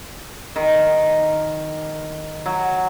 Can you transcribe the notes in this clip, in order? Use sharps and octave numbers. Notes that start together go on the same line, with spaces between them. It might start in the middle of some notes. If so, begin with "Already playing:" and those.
D#3
F#3